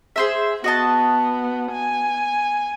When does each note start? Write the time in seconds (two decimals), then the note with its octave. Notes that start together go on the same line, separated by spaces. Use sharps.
0.16 G#4 C5 E5
0.64 B3 F#4 D#5 A5
1.71 G#5